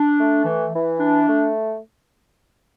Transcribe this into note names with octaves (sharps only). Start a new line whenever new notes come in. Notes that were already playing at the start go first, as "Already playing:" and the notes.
Already playing: D4
A3
E3
E3
D4
A3